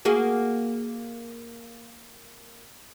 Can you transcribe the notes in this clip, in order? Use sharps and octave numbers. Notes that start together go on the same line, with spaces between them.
A#3 F#4 G#4